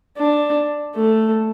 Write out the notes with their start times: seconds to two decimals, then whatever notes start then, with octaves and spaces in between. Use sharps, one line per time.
0.18 D4
0.95 A3